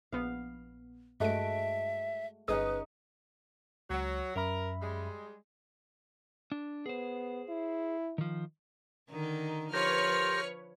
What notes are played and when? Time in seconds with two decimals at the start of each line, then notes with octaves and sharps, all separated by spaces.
0.12 A#1 B3 F5
1.20 G2 G#3 A3 F#4 E5 D7
2.48 G1 C#4 D#4 G#4 B4 D#5 D#6
3.90 C#2 F#3
4.36 F#2 A#4 E5 B5
4.82 G3 G#3
6.52 D4
6.86 B3 G#4 C5
7.49 E4
8.18 D#3 F3
9.11 D3 D#3 D#4
9.73 F3 G4 A#4 B4 C#5 C6 F6